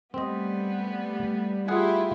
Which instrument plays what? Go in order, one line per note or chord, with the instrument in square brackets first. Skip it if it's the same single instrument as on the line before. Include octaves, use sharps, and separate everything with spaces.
[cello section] G3 A3 [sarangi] B3 [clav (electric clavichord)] C4 D#5
[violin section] E4 F4 G4 [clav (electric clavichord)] G#4 F#5 G#5